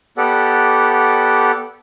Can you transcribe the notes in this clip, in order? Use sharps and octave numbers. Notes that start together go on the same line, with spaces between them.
B3 G4 A4 D5 F#5